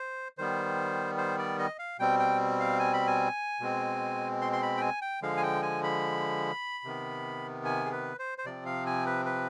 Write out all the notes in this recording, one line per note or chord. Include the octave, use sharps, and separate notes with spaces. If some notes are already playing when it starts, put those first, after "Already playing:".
Already playing: C5
D#3 G3 B3 C5
C5
D5
D#5
F5
B2 G3 C4 G5
G5
F5
G#5
B5
G#5
B2 G#3 C4
C6
C6
B5
G5
G#5
G5
D3 F3 G#3 F5
G#5
G5
G#5
B5
C3 D#3 B3
G#5
G#4
B4
C5
C5
C3 F3 C4 D5
F5
G#5
B4
B4